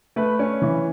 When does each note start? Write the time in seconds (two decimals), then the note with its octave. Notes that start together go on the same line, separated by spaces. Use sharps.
0.16 A3 B4
0.39 C#4
0.62 E3